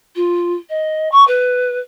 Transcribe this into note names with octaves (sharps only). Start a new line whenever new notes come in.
F4
D#5
C#6
B4